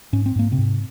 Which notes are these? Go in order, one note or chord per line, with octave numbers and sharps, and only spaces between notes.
G#2 C#4
C4
G#2 A#3
C3 C4
G#2